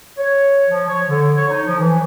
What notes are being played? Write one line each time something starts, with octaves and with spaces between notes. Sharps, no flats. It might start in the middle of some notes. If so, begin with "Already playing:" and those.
C#5
F3
C#5
D3
C#5
D#4
F3
E3